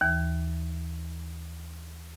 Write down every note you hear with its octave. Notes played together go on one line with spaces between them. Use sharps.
D#2 E3